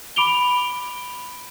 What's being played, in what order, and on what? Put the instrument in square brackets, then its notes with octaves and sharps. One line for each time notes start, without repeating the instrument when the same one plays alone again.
[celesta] B5 D6 D7 F7 G7